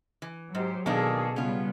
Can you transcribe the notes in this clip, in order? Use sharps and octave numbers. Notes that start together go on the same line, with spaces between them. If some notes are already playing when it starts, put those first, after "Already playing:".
E3
G#2 F#3 G4 C5
B2 D#3 A#3 D4 G#4 A4
C#3 G3 B3 C#4 F4